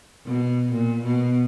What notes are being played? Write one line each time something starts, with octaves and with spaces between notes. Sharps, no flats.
B2
A#2
B2